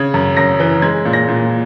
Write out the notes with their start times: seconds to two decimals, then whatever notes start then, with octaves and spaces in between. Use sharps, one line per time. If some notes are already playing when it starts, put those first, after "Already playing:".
Already playing: C#3 C#4 G#6
0.14 F#2
0.37 F#2 A#6
0.60 E3
0.82 G#3 G#6
1.05 A#2
1.13 A#6
1.28 A#2